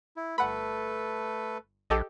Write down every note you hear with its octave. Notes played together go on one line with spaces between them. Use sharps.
E4
G1 A3 A4 B4 F#5 B5
A#1 G4 A4 D#5